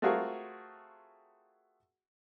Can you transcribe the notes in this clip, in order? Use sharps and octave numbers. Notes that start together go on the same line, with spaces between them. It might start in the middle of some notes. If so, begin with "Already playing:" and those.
A3 C4 F4 F#4 G#4 A#4